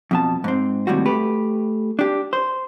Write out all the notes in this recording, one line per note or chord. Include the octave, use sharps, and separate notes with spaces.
F2 B2 A5
G#2 C4
D#2 A2 C3 G3 F#4
A3 G4 B4
D4 G4
C5